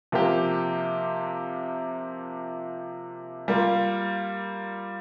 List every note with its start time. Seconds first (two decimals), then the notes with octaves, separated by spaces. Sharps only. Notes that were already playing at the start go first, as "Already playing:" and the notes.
0.12 C3 F3 A#3 G4
3.48 G3 A#3 F4